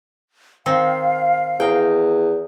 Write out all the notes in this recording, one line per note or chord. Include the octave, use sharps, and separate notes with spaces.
D#3 C4 F5
E2 D#4 G5